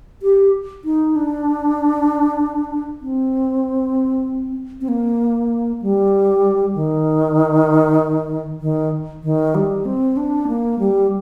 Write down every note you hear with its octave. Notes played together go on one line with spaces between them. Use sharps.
G4
D#4
D4
C4
C4
A#3
G3
D#3
D#3
D#3
G3
C4
D4
A#3
G3